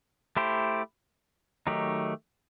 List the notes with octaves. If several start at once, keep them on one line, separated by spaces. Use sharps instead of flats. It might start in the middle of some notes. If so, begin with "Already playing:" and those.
A3 E4 G4 C5
D#3 F#3 A3 D#4 G4